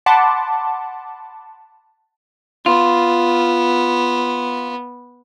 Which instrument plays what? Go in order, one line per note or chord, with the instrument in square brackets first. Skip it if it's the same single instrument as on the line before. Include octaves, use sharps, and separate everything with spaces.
[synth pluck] F#5 A5 B5 C6 D6
[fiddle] B3 [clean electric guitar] F4